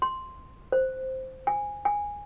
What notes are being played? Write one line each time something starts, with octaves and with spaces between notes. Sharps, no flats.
C6
C5
G#5
G#5